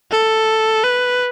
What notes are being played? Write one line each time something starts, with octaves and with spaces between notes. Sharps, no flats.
A4
B4